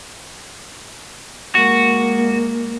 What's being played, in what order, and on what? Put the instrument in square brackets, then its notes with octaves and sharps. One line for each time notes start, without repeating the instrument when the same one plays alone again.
[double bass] G#3 A#3 [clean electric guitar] F#4